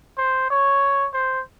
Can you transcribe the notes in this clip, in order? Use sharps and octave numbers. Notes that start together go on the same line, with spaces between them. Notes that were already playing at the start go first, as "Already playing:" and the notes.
C5
C#5
C5